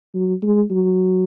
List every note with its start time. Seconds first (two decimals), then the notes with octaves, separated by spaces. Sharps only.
0.14 F#3
0.43 G#3
0.70 F#3